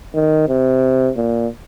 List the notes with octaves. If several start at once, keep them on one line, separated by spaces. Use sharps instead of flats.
D#3
C3
A#2